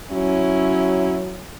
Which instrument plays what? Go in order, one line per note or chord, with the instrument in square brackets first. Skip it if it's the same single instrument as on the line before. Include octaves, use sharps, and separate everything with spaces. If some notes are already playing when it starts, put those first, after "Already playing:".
[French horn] F#3 [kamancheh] C#4 E4